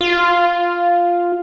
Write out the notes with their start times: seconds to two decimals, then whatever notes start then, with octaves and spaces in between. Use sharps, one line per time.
0.01 F4